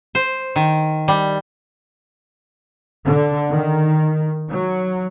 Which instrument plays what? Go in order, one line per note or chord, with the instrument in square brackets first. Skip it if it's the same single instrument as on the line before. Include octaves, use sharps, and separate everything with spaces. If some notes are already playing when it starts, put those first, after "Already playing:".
[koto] C5
D#3
G3
[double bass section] D3
D#3
F#3